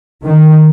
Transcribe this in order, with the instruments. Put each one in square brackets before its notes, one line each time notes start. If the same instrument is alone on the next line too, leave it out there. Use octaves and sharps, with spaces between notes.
[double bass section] D#3